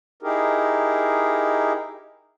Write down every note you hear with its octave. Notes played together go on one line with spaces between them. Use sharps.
D#4 E4 G4 G#4 A#4